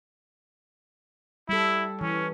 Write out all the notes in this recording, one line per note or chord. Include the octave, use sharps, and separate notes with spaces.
G3 E4 A4
E3 C#4